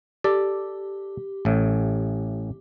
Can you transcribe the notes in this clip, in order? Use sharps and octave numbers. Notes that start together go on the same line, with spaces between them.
G4 A4 D5
A1 A2